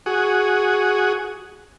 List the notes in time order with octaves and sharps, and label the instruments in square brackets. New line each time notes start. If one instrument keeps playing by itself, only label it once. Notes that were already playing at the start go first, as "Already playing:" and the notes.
[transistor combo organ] F#4 G#4